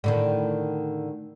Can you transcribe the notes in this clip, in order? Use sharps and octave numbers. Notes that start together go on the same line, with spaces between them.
A2 D3 D#3